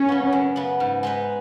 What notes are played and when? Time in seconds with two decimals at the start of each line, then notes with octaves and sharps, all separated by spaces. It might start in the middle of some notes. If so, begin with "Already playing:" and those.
Already playing: F#2 C#4
0.09 C#3 B3
0.33 F#2
0.56 C#3 B3
0.80 G#2
1.03 G#3 D#4 B4